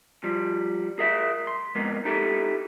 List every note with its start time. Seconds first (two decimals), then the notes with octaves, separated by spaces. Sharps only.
0.24 F3 G3
0.99 G#4 A#4 E5
1.47 C6
1.75 F2 G#2 A#3 B3
2.05 D#4 E4 G4 A4